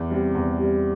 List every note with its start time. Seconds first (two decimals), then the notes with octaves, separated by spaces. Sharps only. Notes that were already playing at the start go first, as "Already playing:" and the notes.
Already playing: E2
0.10 C3 G3
0.35 E2
0.59 C3 G3